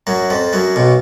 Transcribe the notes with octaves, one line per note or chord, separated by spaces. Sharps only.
F#2 F#3
F2 F3
F#2 F#3
B1 B2